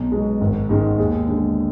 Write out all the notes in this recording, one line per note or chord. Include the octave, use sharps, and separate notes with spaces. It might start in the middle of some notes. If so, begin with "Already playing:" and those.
Already playing: B1
B2 G#3
G#1
G#2 D#3 G#3
D#2 G#4
D3 G#3